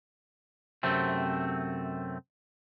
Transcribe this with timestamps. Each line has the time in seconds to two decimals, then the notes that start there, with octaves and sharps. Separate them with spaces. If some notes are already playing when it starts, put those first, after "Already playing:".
0.83 F#2 C3 A3 C4